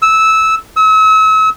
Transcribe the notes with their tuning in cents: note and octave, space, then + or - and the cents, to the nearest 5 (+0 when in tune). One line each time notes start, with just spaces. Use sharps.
E6 -15
E6 -40